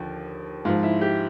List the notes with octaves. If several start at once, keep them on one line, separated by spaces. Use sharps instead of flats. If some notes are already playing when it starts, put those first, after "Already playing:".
Already playing: D#2 D3 F3
G#2 F3 F4
E4
G4